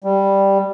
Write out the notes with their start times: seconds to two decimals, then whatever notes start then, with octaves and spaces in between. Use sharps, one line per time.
0.04 G3